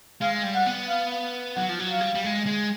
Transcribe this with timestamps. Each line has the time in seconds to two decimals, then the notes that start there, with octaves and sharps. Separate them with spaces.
0.21 G#3 F5
0.44 G3
0.55 F#5
0.66 B3
0.89 F5
1.56 F#3 F#5
1.69 F3
1.80 F#3
1.90 F5
2.01 G3
2.15 G3
2.24 G#3
2.46 G#3